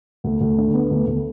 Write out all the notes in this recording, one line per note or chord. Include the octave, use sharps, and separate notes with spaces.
D2
D2
D3
B3
D2
D2